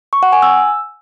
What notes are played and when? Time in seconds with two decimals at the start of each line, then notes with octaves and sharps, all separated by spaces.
0.13 C#6
0.23 F#5
0.33 G#5
0.42 E6